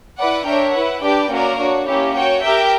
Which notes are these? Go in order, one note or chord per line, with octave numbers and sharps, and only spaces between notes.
E4 B4 D5 F#5
D4 A#4 C#5 E5 G5
E4 B4 F#5
D4 G4 B4 D5 G5
A#3 C#4 F#4 A#4 D5
D4 F#4 C#5
A#3 C#4 E4 G4 C#5
F#4 C#5 G5
G4 A#4 E5 G5